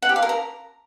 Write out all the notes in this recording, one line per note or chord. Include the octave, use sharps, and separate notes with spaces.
F#5
G4
F5
A#4
A#5